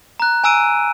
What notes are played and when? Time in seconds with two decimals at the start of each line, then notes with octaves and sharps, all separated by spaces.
0.20 A#5 F#6
0.44 G#5 A#5 E6 D7 D#7